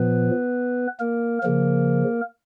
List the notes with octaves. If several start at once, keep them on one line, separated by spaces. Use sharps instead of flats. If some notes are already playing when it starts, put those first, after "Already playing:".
Already playing: A#2 F3 B3 B4
A#3 A#4
C#3 F3 A#3 A#4